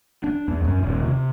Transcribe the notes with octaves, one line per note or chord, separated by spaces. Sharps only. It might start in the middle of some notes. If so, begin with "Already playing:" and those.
D4
E2
F#2
D#1
C3